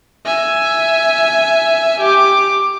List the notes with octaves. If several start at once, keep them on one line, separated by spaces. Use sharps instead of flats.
E5 G#5
G4 D6